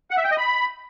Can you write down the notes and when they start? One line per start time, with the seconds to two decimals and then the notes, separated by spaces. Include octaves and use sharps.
0.11 F#5
0.17 E5
0.24 G5
0.31 D#5
0.38 B5